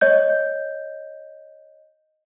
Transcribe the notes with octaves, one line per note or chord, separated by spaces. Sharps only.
C#5 D#5 G6